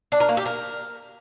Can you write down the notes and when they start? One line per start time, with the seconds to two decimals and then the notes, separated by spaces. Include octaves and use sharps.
0.12 D4
0.20 A#4
0.29 A#3
0.37 G4
0.46 A#4